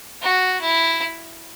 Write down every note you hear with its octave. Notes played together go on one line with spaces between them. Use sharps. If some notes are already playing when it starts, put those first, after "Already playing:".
F#4
E4